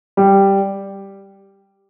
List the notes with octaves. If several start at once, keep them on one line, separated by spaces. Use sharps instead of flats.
G3